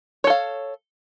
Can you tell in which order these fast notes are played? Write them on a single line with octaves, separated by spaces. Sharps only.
C#5 A4 F5